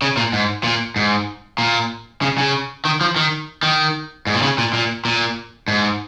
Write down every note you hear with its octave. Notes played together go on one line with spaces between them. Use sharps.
C#3
A#2
G#2
A#2
G#2
A#2
C#3
C#3
D#3
F3
D#3
D#3
G#2
A#2
C#3
A#2
A#2
A#2
G#2